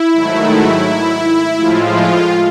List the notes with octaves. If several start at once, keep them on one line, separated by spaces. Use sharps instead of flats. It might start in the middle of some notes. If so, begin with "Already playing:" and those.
Already playing: E4
G#2 D#3 F#3 A3
A2 F3 G#3 F4